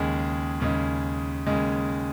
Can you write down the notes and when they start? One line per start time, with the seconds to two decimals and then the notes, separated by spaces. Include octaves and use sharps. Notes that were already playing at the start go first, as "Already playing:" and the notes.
Already playing: D#2 C#3 G#3 G#4
0.60 D#2 C#3 G#3
1.47 D#2 C#3 G#3